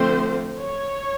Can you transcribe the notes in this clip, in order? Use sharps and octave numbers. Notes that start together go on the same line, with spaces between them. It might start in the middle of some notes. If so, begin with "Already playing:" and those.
Already playing: D3 F3 A3 C4 C5
C#5